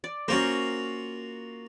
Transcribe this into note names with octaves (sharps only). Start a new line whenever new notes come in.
D5
A#3 C#4 F4 F#4 A#4 C5